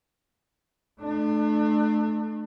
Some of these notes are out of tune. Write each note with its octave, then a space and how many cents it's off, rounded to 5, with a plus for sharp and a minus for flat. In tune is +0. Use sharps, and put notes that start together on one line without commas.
A3 -20 D4 +35